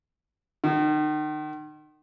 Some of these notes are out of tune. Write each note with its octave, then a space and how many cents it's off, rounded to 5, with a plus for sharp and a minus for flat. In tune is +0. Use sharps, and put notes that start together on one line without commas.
D#3 -35